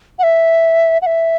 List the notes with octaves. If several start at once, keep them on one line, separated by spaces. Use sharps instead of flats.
F#5
E5
F#5
E5